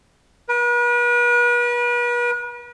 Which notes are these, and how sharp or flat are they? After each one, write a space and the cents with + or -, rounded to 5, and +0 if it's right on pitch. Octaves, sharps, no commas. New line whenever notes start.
B4 -40